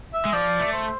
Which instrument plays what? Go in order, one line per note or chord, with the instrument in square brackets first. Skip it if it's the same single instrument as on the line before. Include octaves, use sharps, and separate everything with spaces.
[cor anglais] E5
[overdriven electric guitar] G#3
[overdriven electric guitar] F3 [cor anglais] D5
[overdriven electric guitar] A3
[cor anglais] C5